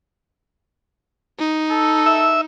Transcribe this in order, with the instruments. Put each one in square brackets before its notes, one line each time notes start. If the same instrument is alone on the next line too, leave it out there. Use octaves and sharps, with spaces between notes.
[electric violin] D#4
[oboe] A4
[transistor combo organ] E5